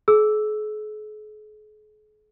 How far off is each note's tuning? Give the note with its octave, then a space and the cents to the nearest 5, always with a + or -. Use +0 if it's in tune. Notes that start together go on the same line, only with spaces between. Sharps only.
G#4 +45 E6 +0